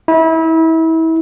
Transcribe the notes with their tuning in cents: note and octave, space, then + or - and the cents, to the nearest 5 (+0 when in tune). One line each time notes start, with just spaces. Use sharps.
E4 -30